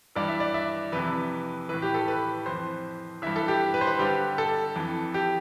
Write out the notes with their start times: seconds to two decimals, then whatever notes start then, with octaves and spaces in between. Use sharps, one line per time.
0.16 G2 E3 D5
0.28 E5
0.40 D5
0.54 E5
0.92 F2 C3 E3 B4
1.69 A2 E3 B4
1.82 G4
1.94 A4
2.08 B4
2.46 F2 E3 C5
3.22 G2 E3 E5
3.36 A4
3.48 G4
3.74 B4
3.81 C5
3.87 B4
3.99 G2 D3 G4
4.38 A4
4.76 F2 E3
5.14 G4